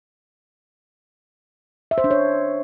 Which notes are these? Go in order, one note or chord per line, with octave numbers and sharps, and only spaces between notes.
E5
C5
D4
C#5